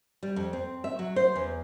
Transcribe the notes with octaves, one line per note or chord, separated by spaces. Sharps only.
G3
F2
C4
E5
F#3
C5
E2